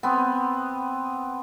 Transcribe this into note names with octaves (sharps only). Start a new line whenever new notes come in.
B3 C4